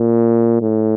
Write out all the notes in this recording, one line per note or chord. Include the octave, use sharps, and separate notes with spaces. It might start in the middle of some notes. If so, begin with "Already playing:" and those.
Already playing: A#2
A2